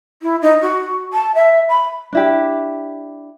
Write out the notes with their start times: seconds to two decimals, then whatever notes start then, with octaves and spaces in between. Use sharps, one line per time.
0.22 E4
0.42 D#4
0.62 F#4
1.13 A5
1.35 E5
1.69 B5
2.13 D4 E4 G4